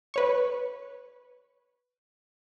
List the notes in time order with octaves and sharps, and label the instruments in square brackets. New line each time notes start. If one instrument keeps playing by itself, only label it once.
[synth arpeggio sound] B4 C#5 C#6